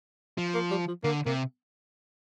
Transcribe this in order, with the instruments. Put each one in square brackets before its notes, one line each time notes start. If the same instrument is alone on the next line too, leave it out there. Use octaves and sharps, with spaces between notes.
[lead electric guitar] F3
[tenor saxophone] A#3
G3
F3
[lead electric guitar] D3 [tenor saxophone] A#3
[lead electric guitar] C3 [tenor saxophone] A#3